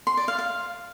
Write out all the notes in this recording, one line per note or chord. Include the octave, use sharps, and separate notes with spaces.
C6
D5
F5
F5